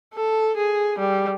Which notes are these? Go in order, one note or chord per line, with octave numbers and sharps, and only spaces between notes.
A4
G#4
G3